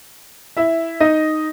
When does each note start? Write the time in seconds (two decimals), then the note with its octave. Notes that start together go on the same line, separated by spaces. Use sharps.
0.57 E4 E5
1.00 D#4 D#5